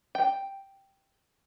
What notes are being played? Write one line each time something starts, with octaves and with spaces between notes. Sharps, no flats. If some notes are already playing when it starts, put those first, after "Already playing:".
G5